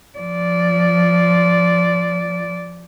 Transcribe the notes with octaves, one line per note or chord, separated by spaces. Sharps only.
F3 D5